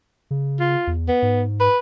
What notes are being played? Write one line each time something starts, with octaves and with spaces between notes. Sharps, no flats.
C#3
F4
E2
B3
G#2
B4